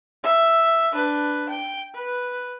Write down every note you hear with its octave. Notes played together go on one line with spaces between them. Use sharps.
E5
D4 B4
G5
B4